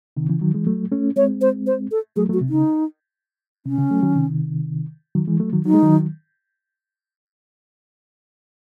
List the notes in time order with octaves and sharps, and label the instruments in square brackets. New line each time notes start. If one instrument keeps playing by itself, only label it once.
[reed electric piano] C3 D#3
C#3 E3
D#3 F#3
E3 G#3
F#3 A3
A3 C#4
[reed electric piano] G#3 C4 [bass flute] C#5
[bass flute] C5
C5
A4
[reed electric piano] F#3 A3 [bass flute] G#4
[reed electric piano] F#3 A3
[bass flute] F#4
[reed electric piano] C3
[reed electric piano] C#3 [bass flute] D#4
[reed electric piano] C3 [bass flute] C#4
[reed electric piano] C#3
F#3 A3
D#3 F#3
C3 D#3
D#3 F#3
E3 G#3
F#3 A3
D#3 F#3
[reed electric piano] F#3 [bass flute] D#4
[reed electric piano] G#3
D#3 F#3